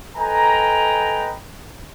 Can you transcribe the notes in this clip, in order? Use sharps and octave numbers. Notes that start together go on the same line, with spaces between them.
A4 B4 D#5 G5 G#5 A#5